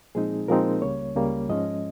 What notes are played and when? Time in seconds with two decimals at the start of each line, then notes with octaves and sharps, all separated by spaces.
0.15 A#2 F3 G#3 C4 D#4 G#4
0.48 A#2 F3 G#3 C4 D#4 A#4
0.82 C#2 C#3 G3 A#3 C#5
1.16 C#2 C#3 G3 A#3
1.49 G#2 F3 G#3 C#4 D#5